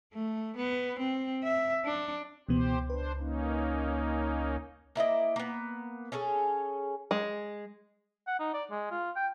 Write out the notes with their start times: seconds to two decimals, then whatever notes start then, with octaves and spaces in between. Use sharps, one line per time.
0.13 A3
0.57 B3
0.99 C4
1.43 E5
1.85 D4
2.49 C#2 B2 E3 B3 G4 C5
2.90 D4 B4 C5
3.18 A#3 C#4 D#4
4.95 A#3 E4 D5 D#5
5.36 A#3 B3
6.12 C#4 G#4 A4 C#5
7.11 G#3
8.27 F#5
8.40 D#4
8.54 D5
8.71 G#3
8.91 F4
9.16 G5